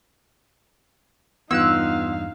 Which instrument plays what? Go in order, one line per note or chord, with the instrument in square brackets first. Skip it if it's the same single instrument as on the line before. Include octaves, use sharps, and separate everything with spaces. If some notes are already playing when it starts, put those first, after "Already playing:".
[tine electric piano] E2 G2 [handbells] B3 F4 F#6 [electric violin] D#4 F5 [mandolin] E6